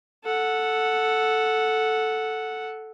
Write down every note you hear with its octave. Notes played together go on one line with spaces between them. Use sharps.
A4 F#5